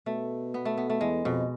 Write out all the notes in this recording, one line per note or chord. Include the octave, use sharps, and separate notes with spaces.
B2 A3
B3
A3
B3
A3
E2 G#3
F2 B2